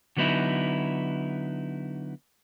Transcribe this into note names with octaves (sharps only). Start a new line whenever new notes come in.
D3 F#3 B3 D#4 E4